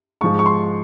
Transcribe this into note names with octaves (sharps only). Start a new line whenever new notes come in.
G#2 F3 G#3 C#6
C#6
C6